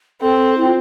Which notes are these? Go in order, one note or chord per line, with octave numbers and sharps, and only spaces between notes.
C4 A4
E4
F4